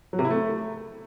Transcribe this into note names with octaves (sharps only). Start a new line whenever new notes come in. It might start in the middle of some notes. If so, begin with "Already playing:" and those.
F#3
C3
E4
A3